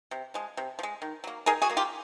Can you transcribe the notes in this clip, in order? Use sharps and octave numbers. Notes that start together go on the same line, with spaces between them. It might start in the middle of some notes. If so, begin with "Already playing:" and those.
C3
F3 G#3
C3
F3
G#3
D#3
F#3 A#3
D#3 G#4 A#4
F#4 G#4
F#3 A#3
F4 G4